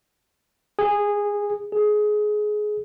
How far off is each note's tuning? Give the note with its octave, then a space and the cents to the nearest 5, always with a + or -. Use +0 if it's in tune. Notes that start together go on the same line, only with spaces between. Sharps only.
G#4 -15
G#4 +20